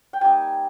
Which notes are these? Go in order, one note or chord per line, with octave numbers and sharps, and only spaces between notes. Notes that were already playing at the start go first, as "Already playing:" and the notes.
G5
G3 A#3 D#4 G#5